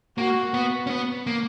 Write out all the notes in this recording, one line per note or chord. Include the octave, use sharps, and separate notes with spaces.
A#3 F#4
B3
C#4
B3
A#3